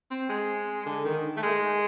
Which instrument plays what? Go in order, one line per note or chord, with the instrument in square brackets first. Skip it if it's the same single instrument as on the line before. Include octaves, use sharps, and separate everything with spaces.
[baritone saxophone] C4
G#3
D3
D#3
A3
G#3